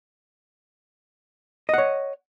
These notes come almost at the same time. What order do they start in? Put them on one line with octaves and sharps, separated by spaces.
D#5 F#5 C#5